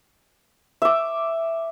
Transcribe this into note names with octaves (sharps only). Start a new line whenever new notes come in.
E5 D6